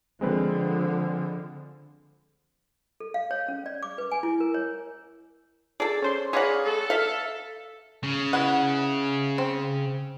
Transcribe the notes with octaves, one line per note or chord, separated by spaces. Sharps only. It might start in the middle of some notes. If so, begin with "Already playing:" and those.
D3 F3 G#3 C4 B4
A4
F5
C#5
C#4
D5
D6
B4
G#5
E4
A#4
C#5
G#4 A4 D5
C#4 C5 C6
G#4 B4 C#5 D5 F5 F#5 A#5
A4
E5 F5
C#3
B3 E4 F#5
C4